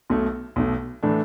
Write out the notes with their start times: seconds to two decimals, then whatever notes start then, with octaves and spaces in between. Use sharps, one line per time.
0.10 B1 B2 A3
0.56 B1 B2 A3
1.03 A2 E3 A3 D4